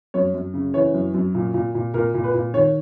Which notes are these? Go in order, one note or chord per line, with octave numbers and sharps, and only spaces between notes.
F#2 C#5
F#2
C#3
E3 C#5
F#2
F#2
A#2
A#2
A#2
A#2 A#4
A#2
B4
A#2
D#3 C#5